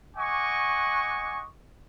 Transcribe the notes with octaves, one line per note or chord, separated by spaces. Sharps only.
D#5 F#5 G#5 C#6 D6